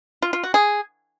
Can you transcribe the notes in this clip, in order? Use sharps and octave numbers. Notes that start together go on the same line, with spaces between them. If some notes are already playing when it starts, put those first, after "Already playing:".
F4
F4
F#4
G#4